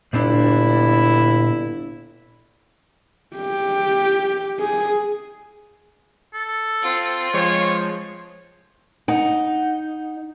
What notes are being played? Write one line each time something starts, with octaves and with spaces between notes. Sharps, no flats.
G1 A#2 C4 D4 E4
G4
G#4
A4
C4 F4
F3 G#3 C5 C#5
D#4 F#5